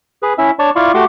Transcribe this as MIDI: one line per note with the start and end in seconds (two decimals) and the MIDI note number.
0.23 0.33 68
0.23 0.33 71
0.38 0.51 61
0.38 0.51 64
0.38 0.51 76
0.59 0.70 62
0.59 0.70 73
0.59 0.70 74
0.59 0.70 81
0.59 0.70 85
0.76 0.92 64
0.76 0.92 65
0.76 0.92 74
0.76 0.92 77
0.76 0.92 85
0.94 1.05 57
0.94 1.05 66
0.94 1.05 67
0.94 1.05 78
0.94 1.05 84
0.94 1.05 86